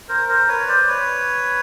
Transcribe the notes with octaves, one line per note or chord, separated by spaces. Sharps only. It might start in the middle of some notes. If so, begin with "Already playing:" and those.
A#4 C5
A#4 C5
B4 C#5
C5 D5
B4 C#5